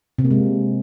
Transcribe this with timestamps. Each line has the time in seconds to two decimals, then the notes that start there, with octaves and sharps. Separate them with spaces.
0.18 C3
0.25 A#3
0.31 G#3